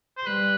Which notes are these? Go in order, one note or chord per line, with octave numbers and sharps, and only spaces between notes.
C5
G3 B4